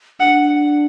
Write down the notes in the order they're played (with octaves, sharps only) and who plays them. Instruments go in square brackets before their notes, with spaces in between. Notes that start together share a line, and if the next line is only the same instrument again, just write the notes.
[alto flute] D4 [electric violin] F#5